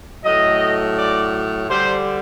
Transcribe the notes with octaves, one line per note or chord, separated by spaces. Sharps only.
A2 F#3 A3 D#5
D5
D3 G3 C5